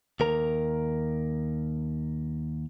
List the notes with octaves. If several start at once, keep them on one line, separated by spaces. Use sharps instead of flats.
D#2 A#4 A#5